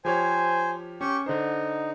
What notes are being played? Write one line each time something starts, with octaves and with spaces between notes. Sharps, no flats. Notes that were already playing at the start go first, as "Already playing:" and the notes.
F3 G4 C5 C#5 G#5
C#4 G4 C#6
D3 D#4 C5